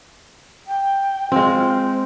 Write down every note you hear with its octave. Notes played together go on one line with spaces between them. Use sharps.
G5
G#3 C4 F4
C5